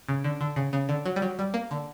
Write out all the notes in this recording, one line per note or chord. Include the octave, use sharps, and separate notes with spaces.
C#3
D3
D3
C#3
C#3
D3
F#3
G3
F#3
G3
A#3
D3